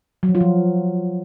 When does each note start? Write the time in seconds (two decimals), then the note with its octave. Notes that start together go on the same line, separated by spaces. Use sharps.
0.23 F#3
0.29 F3
0.35 F4
0.41 F3